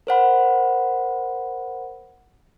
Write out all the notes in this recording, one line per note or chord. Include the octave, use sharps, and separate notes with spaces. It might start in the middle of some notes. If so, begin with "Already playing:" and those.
A#4 C5 F#5 B5